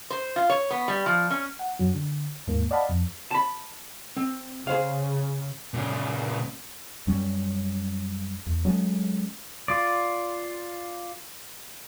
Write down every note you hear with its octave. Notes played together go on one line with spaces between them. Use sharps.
C5
F4
C#5
B3
G3
F3
C#4
F#5
F#2 F#3
D3
D#2 G#2 A#3
D5 D#5 F5 F#5 A5 B5
F2
A5 B5
C4
C#3 G#4 C5 F5
A#2 C#3
F#2 G3 C#4
E2
F#3 G#3 A3 C#4
F4 D5